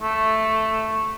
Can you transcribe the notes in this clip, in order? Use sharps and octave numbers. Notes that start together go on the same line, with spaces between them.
A3